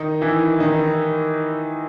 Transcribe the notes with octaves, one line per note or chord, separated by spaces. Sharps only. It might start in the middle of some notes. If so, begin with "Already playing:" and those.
Already playing: D#3 D#4
E3 E4
D#3 D#4